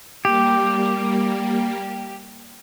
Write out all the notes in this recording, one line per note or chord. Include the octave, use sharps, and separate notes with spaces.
G3 A#3 G4